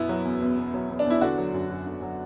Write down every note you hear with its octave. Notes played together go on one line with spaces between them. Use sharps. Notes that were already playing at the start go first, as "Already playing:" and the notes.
Already playing: F#2 B2 B3 E4
F#3
E2
E2
B2
F#3
E2
D4
E2 E4
D3 D4 F#4
F#3
F#2
F#2
D3
F#3